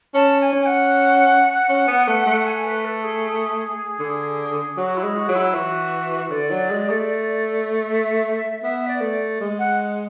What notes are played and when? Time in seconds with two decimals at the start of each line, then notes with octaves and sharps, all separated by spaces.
0.14 C#4 A5
0.40 G#5
0.53 C#4
0.60 G#5
0.66 F#5
1.69 C#4
1.88 B3
2.08 A3
2.26 A3
2.46 G#5
2.65 B4
2.85 A4
3.04 G#4
4.00 D3
4.77 F#3 F#4
4.97 E4
5.03 G#3
5.16 F#4
5.29 F#3
5.36 E4
5.54 E3 F#4
6.31 D3 D5
6.51 F#3
6.70 G#3
6.90 A3
7.86 E5
8.63 B3 E5
8.88 D5
9.01 A3
9.41 G#3
9.59 F#5